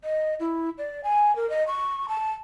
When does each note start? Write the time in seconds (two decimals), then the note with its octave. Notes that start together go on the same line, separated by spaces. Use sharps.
0.04 D#5
0.40 E4
0.78 D5
1.04 G#5
1.36 A#4
1.50 D#5
1.67 C#6
2.08 A5